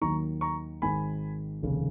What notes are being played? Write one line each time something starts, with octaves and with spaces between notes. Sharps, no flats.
D#2 D#3 F#3 A#3 A#5 C#6
A#5 C#6
G#1 G#2 D#3 G#5 B5
F1 D#2 C#3